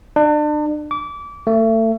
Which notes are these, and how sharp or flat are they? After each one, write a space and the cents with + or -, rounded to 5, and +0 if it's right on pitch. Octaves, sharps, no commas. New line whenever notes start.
D4 +35
D6 -25
A3 +30